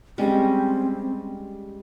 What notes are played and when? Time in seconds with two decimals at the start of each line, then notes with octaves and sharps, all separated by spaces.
0.18 G3 G#3 C4 C#4